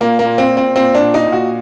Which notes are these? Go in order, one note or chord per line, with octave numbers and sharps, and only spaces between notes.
A#2 A#3
A#3
A#2
C4
A#2
C4
A#2 C4
D4
A#2
D#4
A#2
F#4